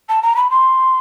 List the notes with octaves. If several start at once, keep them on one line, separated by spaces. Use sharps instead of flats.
A5
A#5
B5
C6